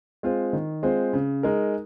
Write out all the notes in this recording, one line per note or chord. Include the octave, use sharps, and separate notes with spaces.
G#3 C4 F4 C5
D#3
G#3 C4 F4 C5
C#3
G#3 D#4 A#4